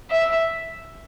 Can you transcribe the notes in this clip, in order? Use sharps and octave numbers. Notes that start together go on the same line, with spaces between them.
E5